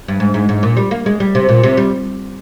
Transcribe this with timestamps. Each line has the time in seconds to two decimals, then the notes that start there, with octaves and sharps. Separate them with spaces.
0.08 G2
0.20 G#2
0.34 G#2
0.49 G#2
0.63 A#2
0.77 G3
0.91 A#3
1.06 G#3
1.20 G3
1.35 C3
1.49 A#2
1.63 C3
1.77 G3